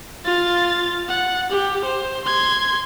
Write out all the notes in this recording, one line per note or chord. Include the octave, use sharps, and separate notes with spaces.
F4 A6
F#5
G4
C5
C6 G#6